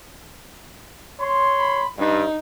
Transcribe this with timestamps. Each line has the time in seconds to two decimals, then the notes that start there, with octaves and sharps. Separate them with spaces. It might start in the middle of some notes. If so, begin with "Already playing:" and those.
1.20 C#5 C6
1.60 B5
1.99 G2 D#4